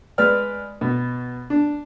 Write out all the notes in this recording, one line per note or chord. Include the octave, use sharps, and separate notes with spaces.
G#3 B4 D5 F6
B2
D4